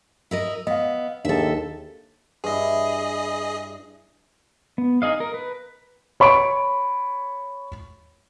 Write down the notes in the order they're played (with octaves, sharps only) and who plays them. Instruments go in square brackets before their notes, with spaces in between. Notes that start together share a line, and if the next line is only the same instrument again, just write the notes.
[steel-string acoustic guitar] E4 A#4 D#5
[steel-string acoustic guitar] B3 [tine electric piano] D#5 F5
[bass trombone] D#2 [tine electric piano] D4 G#4 [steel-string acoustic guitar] A4 E5
[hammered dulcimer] G2 E4 [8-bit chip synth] G#4 D#5
[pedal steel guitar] B3
D#4 G#4 D#5 F5
A#4
B4
[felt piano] C#5 B5 C#6 D7